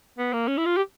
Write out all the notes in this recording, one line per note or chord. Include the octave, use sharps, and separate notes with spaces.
B3
A#3
C#4
E4
F4
G4